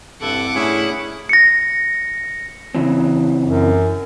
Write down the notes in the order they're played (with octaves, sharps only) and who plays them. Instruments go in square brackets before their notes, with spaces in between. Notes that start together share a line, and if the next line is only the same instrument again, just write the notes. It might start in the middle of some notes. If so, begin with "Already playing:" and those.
[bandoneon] G2 A4 [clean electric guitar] C3 E4 [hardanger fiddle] F#5 D6
[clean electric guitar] A2 D4 [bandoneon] C#4 G#4 [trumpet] E4
[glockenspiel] A#6 C#7
[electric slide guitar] C#3 E3 C4
[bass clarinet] F#2